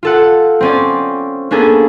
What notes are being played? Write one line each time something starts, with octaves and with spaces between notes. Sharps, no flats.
F4 A4 F#5
C4 C#4 D5
A#3 B3 C#4 D4 G#4 A4